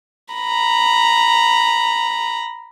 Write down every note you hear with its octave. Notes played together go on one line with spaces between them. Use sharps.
A#5 B5